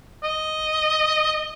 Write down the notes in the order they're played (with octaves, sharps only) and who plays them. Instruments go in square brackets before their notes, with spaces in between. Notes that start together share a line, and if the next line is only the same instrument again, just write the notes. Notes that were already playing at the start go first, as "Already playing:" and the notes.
[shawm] D#5